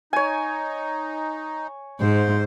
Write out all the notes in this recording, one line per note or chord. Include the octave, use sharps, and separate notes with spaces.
D#4 C#5 G#5
G#2 C5